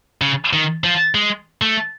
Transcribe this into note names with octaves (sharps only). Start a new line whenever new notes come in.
C#3
D#3
F3
G#3
A3